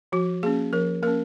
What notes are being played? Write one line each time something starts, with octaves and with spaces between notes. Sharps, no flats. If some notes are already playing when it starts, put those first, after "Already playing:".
F3 F#4
A#3 C#4 G#4
F3 A#4
A#3 C#4 A#4